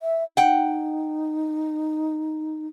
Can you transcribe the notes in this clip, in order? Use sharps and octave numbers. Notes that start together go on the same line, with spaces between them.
E5
D#4 F#5 G5